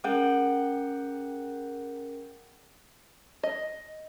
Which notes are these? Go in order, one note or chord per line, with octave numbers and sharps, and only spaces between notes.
C#4 G#4 A#4 F#5 G5
D#5